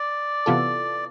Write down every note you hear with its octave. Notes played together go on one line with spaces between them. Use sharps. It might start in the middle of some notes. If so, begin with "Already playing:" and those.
Already playing: D5
C3 E3 B3 F4 A4